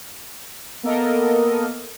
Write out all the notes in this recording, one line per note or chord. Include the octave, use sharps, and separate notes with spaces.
A#3 B3 A4 A#4 D#5